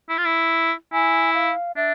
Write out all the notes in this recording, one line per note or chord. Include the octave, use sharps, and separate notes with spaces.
E4
F4
E4
E4 G#5
F5
D4 E5